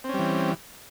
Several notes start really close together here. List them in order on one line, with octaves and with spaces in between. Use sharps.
C4 C#4 G3 E3